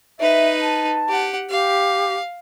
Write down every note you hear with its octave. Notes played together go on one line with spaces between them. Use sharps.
D#4 B4 E5
A5
G4 F#5
G4 F5